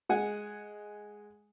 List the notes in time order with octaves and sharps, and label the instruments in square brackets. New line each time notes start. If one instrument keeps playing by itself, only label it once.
[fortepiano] G#3 F#5 G#5